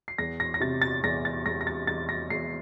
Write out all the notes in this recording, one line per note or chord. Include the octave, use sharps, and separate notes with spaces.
C7
E2 A#6
A#6
A#6
C3 A6
A6
E2 A#6
A6
E2 A#6
A#6
A6
E2 A6
A#6
E2 C7